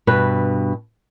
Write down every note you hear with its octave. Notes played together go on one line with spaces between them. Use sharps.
G2 B2 B4